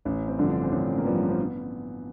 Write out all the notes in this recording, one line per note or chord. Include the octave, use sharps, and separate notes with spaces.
A1 C#4
C4
G2 D3 F3
D4
C4
A1 C#4
A#3
G2 D3 F3 B3
C#4
C4
B3